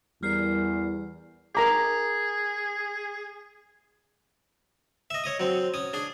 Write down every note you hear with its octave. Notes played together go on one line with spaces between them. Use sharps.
E2 G3 A#4 D5 F6 C7
G#4 A#4 A#5 D6
D#5 E5
C#5 D#5 D#6
F#3 C4
C#4 D#6
D4 G#4